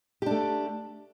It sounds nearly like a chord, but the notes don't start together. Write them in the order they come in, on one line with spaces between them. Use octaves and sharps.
G4 D4 A3